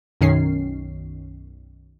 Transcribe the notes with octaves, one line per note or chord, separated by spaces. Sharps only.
B1 F#2 D#3 C#4 C7